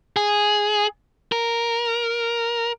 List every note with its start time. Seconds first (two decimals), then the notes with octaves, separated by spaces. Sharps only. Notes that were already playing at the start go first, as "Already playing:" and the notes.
0.16 G#4
1.32 A#4